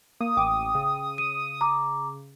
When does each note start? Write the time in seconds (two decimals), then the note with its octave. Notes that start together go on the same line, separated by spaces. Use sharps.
0.20 A#3 D#6
0.37 A1 G5 D6
0.75 C#3
1.18 D#7
1.61 A#5 D6